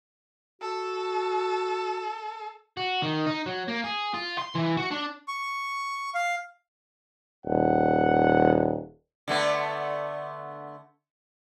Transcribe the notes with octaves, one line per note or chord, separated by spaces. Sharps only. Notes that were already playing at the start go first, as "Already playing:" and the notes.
F#4 A4
F#4
D#3
D#4
F#3
A#3
G#4
F4
C6
E3
F#4
D4
C#6
F5
D#1 F#5
D3 A3 B3